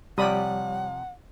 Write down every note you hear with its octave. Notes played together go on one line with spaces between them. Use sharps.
C3 F3 G3 C#5 D5 F#5 B5 D#6